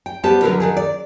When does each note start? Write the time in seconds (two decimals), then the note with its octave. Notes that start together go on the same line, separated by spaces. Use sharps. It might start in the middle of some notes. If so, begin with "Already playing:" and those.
0.06 G5
0.23 G3 B3 G4 C5 A5
0.42 D3 F#3 G3 F4 A#4 B4
0.60 D#3 F#3 G#4
0.77 D5